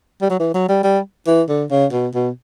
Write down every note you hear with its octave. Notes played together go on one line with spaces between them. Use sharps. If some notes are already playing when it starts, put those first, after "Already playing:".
G3
F#3
E3
F#3
G3
G3
E3
D3
C#3
B2
B2